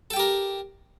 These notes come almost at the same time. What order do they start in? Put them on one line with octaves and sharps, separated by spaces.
A4 G5 G4 A#4